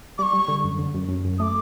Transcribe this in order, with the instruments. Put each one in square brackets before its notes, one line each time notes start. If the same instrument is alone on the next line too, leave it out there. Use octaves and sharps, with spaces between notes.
[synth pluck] G3 [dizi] C#6 D6
[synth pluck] G3
D3
F#2
D3
F#2
F#2
F#2
[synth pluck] A3 [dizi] D6 D#6